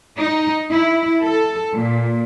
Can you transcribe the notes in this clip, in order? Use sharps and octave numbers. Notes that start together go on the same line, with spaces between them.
D#4
E4
A4
A#2